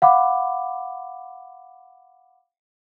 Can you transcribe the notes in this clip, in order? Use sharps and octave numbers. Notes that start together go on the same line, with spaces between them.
F5 F#5 B5 D6